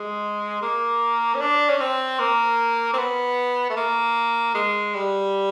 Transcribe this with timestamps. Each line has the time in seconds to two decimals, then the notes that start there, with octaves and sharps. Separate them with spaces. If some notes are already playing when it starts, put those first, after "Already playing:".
Already playing: G#3
0.62 A#3
1.34 C#4
1.41 D4
1.69 C#4
1.80 C4
2.19 A#3
2.93 C4
2.98 B3
3.70 A3
3.76 A#3
4.54 G#3
4.94 G3